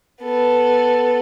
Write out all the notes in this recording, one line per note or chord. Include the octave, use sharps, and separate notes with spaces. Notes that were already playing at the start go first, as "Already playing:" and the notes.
B3 A4